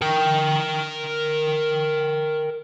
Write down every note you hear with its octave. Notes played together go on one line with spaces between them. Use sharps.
A#4 G5